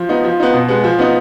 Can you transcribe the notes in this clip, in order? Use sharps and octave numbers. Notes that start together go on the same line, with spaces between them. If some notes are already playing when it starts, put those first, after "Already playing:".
Already playing: F3
B3 D#4
F3
B3 D#4
B2
G#3 B3
F3
B3 D#4